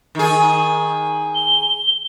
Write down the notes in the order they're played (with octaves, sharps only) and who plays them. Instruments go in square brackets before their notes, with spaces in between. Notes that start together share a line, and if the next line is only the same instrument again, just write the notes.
[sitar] D#3 G#4
[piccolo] G7